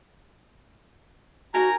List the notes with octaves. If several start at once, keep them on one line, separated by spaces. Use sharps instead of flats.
D#4 F#4 A#4 G#5 A#5